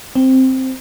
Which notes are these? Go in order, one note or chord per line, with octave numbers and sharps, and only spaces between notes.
C4